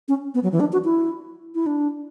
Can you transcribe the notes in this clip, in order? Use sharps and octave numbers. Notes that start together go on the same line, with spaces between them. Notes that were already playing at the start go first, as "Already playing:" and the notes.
C#4
B3
F#3
E3
D4
F#4
E4
E4
D4